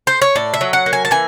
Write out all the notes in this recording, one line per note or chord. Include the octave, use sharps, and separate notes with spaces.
C5
C#5
A2 D5
E5
F#3
F#5
A#3
G#5
A5
E3 G#5